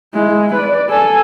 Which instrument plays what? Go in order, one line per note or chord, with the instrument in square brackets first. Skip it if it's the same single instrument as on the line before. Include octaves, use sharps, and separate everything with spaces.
[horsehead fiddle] G#3 E4
B4 D5
A4 G#5